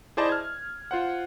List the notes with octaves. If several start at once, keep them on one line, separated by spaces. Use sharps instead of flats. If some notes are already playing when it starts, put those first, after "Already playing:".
E4 G#4 C5 D5 D#5 A5
F6 G#6
F4 C5 F#5